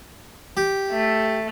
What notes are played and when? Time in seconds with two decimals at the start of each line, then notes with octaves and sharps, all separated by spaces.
0.57 G4
0.92 A3